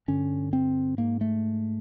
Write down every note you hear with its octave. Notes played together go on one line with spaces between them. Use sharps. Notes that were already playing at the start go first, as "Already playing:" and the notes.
G2 D3 C#4
C4
G#2 A#3
A3